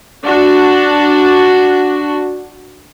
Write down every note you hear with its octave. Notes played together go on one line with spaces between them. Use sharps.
D4 F#4